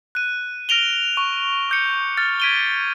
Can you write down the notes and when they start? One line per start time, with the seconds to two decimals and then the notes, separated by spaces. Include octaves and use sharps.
0.15 F#6 D#7
0.69 F6 A#6 D7 F7 G7
1.17 C#6
1.69 D6 G6 C#7
2.17 F6 A6
2.40 G#6 B6 D7 D#7 F7 G7